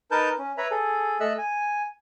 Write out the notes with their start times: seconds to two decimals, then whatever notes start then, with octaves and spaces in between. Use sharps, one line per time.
0.11 D#4 A#4 B4 A5 G6
0.38 C#4
0.58 B4 C#5 E5 A#5 B5
0.71 G#4 A4
1.20 A3 A4 D#5 E5 E6 F#6
1.38 G#5